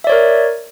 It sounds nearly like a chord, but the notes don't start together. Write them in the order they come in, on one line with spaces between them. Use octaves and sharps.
E5 D5 C#5 A#4